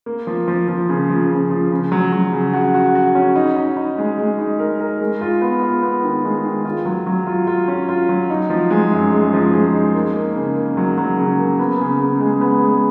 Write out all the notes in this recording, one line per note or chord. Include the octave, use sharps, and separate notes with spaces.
A#3
F3
F3
F3
C#3
F3
C#3
F3
C#3
F#3
F#3
C#3
F#4
F#4
F#4
C#4
D#4
D#4
D#4
G#3
G#3
D#4
A#4
A#4
G#3
F4
B3
F4
B3
D#3
G#3
D#3
F4
F#3
F#3
F4
F4
C#4
F4
F#3
D#4
F3
G#3
F#2
G#3
F3
G#3
D#4
A#3
A#3
C#3
A#3
F#3
F#3
C#3
A#3
B3
C#3
C#3
G#3
B3
G#3